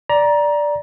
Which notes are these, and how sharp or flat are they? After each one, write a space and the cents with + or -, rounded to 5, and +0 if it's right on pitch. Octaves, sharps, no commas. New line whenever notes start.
D5 +0 A#5 +20